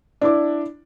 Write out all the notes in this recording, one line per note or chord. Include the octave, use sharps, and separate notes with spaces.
D4 E4 D6